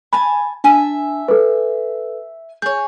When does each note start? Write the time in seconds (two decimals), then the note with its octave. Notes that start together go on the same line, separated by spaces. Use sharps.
0.13 G#5 A5 B5
0.64 D4 E5 G#5 A5
1.28 A4 B4
2.62 G#4 C#5 G6